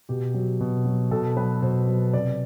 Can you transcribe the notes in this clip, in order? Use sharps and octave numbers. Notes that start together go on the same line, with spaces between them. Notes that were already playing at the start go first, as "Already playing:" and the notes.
B2 G4
F#3
B2
F#3
B2 A4
F#3 B4
B2 C5
F#3
C3 D5